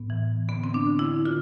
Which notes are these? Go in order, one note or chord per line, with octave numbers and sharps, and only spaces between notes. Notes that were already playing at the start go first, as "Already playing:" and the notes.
Already playing: A2 B3
E3
D3 B3
C4
D4
D3
E4
D3 F4